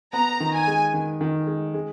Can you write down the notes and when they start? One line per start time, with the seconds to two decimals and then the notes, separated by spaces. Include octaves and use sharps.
0.13 B3 A#5
0.40 D#3
0.53 G#5
0.67 G#3
0.94 D#3
1.21 D#3
1.47 G#3
1.74 G#3